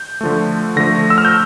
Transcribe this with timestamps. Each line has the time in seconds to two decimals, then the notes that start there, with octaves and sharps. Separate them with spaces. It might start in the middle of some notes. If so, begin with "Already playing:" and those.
Already playing: G6
0.21 D3 F3 A3
0.76 D3 F3 A3 A#6
1.10 E6
1.18 F6
1.25 G6